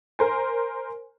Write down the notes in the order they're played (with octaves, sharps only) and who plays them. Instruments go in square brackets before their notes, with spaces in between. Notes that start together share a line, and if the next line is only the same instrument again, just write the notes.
[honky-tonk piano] A#4 C5 G#5